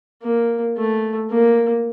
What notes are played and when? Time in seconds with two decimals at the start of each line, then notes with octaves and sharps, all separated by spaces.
0.23 A#3
0.77 A3
1.31 A#3